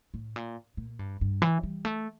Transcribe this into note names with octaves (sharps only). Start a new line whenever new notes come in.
A2
A#2
A#2
G2
G2
E3
G3
A3